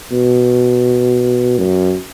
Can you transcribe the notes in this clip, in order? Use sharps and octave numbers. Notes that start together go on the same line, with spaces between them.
B2
F#2